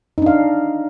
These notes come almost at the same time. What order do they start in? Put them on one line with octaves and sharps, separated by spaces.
D#4 D4 F5